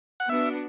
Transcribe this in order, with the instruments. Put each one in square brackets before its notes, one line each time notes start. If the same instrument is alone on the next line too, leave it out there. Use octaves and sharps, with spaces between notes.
[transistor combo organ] F#5
[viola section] B3 D4 F#4 [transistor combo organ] E5